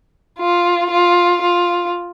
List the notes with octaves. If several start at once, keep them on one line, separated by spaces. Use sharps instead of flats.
F4
F4
F4